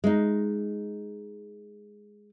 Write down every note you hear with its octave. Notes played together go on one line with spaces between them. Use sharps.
G#3 D#4